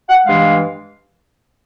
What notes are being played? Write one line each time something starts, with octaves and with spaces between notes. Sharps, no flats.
F#5
G2 E3 G#3 F5